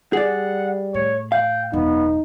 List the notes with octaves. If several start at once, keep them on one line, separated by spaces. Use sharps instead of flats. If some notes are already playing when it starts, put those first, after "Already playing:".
G3 G#4 D5 F#5
A2 C#5
F5 G5
E1 F#2 B3 D#4